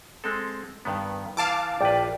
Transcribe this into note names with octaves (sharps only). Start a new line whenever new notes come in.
G#3 C4 A4
G2 D#3 B3
E3 F5 A5 D6
A#1 B4 D5 G5